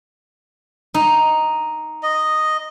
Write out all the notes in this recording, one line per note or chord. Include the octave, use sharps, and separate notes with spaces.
D#4
D#5